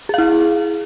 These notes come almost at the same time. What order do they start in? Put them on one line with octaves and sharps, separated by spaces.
G#4 F5 E4